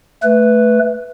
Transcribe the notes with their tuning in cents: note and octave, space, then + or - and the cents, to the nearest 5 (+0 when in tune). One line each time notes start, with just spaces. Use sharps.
A3 +0 B4 +0